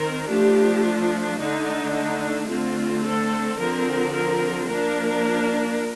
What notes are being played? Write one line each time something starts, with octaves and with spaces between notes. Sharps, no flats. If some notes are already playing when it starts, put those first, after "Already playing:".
Already playing: D#3 C4 A#4
F3 A3 D4 G4
F4
D3 A3 D4 D#4
D#4
D3 A3 C4 F4
A4
D3 F3 C4 A#4
A#4
F3 A#3 D4 A#4